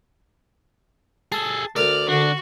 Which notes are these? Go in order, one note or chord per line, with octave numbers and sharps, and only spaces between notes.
G#4 A4 A5
D2 A#4 D5 F6
D3 D4 F#4